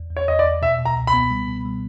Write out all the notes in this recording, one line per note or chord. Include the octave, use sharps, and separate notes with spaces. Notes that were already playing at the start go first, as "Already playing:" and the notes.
Already playing: E2
E2
C#5
E2 D#5
D5
E2
B2 E5
B2
A#5
C#2
B5
B3
G3
B2
G3